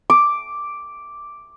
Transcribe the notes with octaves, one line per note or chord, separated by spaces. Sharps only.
D6